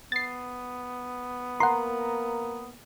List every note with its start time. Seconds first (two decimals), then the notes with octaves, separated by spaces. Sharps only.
0.12 B3 A6 C7
1.60 A#3 F#5 A#5 C6